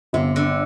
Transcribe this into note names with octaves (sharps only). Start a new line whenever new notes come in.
G1 C3
D3